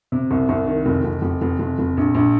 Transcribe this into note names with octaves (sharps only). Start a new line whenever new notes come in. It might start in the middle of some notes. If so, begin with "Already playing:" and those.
C3
C2
C2
D#3
F1
F1
F1
F1
F1
F1
A#1
A#1